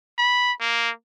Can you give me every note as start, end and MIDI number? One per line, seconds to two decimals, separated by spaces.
0.18 0.52 83
0.60 0.90 58